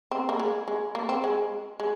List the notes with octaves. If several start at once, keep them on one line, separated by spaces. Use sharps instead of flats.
C4
A#3
G#3
G#3
A#3
C4
G#3
G#3